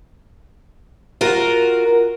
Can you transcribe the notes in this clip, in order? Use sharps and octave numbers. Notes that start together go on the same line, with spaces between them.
F4 F#4 A#4